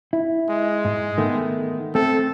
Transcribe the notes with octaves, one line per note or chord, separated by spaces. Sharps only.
E4
G#3
G#2
D#3 A3 B3
A3 C4 A4